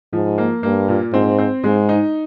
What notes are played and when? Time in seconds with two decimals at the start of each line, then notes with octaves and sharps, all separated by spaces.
0.13 G#2 F3
0.38 A#3
0.63 G2 A#3
0.88 A#2
1.13 G#2 C4
1.38 C4
1.64 G#2 G#3
1.89 D#4